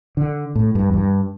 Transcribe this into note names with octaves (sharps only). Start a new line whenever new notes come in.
D3
A2
G2
E2
G2